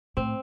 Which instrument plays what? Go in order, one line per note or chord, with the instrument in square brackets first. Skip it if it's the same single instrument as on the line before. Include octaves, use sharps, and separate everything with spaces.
[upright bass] A2 [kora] C4